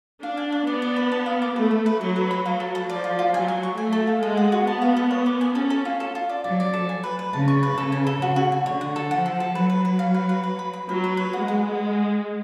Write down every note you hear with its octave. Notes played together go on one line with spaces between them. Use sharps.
D4 F5
G#5
D5
B3 D5
D5
B4
A5
F5
D6
A3 B4
B4
B4
F#3 B4
B4
B5
F#3 F5
A4
A4
F3 D5
F4
F4
F#3 G#5
G#5
C#6
A3 G#5
A4
F5
G#3 A4
F#5
F#4
B3 A5
F5
A4
C#5
D6
G#5
C#4 A4
A4
F4
A4
F4
D5
F#3 D5
D5
A4
G#5
B4
B4
C#3 A5
C#6
B4
C#3 A4
G#5
A4
C#3 F#4
F#4
G#5
D3 C#5
F#5
A4
F3 F#5
A4
A4
F#3 B4
B4
B4
F5
B4
B4
B4
B5
B5
F#3 B5
B4
B4
G#3 F#5
F#5